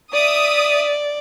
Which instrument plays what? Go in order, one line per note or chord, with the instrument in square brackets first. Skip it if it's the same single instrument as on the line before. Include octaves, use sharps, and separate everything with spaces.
[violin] D5 [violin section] E5 D#6